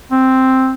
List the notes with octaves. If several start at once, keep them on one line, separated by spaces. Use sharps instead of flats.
C4